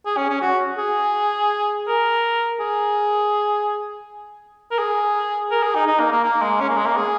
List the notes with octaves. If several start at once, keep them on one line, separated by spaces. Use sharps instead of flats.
G#4
C#4
C#4
F#4
G#4
A#4
G#4
A#4
G#4
A#4
G#4
D#4
D#4
A#3
A#3
A#3
G#3
C#4
A#3
G#3
A#3
G#4